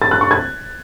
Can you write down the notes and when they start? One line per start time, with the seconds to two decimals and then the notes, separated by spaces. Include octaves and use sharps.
0.02 A6
0.11 F#6
0.21 C#6
0.31 G#6